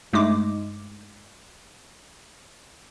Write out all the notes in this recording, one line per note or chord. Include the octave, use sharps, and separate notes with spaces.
G2 G#3 A3 D#4 D6